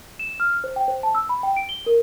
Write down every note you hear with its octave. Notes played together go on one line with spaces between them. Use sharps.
E7
F6
C5
G5
C5
A5
E6
B5
G5
D7
G7
A#4